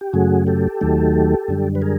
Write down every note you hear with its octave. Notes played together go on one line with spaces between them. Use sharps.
G4
F#2 C#3 F#3 A3 F#4 G#4
G4 A4
D#2 D#3 F#3 A3
F#2 D3 G3
B4
G#4 A#4